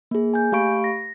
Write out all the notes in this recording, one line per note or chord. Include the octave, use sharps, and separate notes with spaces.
A#3 G#4
G#5 G6
A3 G4 F5 B5 C#6 D7
A#6